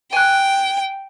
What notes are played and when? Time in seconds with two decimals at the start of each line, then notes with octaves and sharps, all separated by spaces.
0.13 G5 G#5 F#6